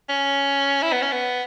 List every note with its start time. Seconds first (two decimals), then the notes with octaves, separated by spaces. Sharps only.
0.09 C#4
0.83 E4
0.92 B3
1.02 C#4
1.12 B3